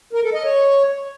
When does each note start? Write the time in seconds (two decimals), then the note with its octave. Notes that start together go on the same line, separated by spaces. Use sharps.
0.13 A#4
0.23 A4
0.34 D#5
0.44 C#5